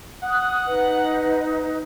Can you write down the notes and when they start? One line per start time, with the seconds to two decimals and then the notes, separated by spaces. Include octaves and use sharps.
0.23 F#5 D#6 F#6
0.66 D#4 B4 D#5